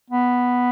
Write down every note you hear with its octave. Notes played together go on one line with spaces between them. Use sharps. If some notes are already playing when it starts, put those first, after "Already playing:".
B3